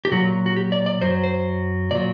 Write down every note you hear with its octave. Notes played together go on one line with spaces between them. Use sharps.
G4
A#2 F#3 F#4
F#4
G4
D5
D5
F#2 F#3 C5
C5
A#2 F#3 D5